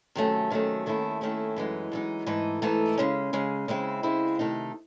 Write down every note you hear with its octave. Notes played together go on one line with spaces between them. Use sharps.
C3 D#3 F#3 A3 C#4
C3 D#3 F#3 A3 C#4
D#2 D#3 A3 C#4 E4
D#2 D#3 A3 C#4 E4
F#2 E3 G#3 D#4
F#2 E3 G#3 D#4
G#2 E3 A3 D#4
G#2 E3 A3 D#4
C#3 G#3 C#4
C#3 G#3 C#4
C#3 G#3 C4 E4
C#3 G#3 C4 E4
C3 D#3 A3 D#4